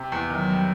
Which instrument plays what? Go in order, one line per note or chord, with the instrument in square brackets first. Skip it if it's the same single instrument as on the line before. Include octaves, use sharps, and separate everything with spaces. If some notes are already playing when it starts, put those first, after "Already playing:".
Already playing: [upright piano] C3
E2
[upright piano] D#3 [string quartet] F#3
[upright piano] G3